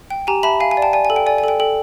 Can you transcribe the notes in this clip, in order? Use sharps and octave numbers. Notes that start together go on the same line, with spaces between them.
G5
G4 G#5 A#5
E5 A5 B5
F5 G#5
G#5
D5
G5 A5
D5 G#5
G#5
A4
G5
D5 G#5
G#5
A4 G5
A4 G5